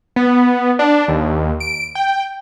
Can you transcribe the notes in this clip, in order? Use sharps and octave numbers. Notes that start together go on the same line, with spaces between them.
B3
D4
D#2
D7
G5